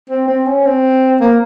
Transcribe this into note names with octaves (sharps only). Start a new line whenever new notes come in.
C4
C4
C#4
C4
A#3